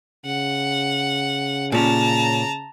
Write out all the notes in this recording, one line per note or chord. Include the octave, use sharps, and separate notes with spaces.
C#3 F#5
A#2 C#4 A5 A#5